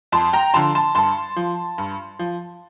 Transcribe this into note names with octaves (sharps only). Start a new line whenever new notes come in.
F2 A5 C6
G5 A#5
D3 F3 A5 C6
A5 C6
G2 A5 C6
F3
G2
F3